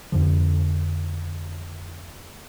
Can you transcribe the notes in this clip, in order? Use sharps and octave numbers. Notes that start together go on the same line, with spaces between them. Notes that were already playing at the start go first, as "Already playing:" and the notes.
F2 D3 F3